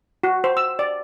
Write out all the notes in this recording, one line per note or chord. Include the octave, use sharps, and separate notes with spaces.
F#4
C5
E6
D5